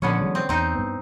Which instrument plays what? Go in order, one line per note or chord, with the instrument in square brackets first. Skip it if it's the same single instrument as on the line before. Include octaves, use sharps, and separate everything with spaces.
[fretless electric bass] A#2 F3 [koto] D3 B3 C#4
[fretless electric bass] E3 F#3 G#3
[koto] C4
[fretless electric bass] E2 [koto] C4 D#4
[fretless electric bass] G2 B3